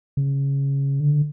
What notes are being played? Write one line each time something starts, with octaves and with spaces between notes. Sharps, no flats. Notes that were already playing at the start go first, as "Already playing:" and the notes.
C#3
D3